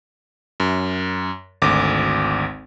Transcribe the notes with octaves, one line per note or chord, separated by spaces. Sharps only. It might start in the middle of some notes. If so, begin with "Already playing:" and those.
F#2
G#1 D2 D6